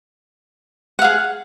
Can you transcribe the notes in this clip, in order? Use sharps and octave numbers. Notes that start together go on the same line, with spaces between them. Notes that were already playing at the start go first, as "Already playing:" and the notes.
G#4 F5 F#5